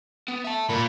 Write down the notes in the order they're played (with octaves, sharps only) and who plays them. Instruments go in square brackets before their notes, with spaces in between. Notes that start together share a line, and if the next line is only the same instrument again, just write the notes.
[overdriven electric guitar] B3
E5 A5
[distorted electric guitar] A#2 [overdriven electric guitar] B5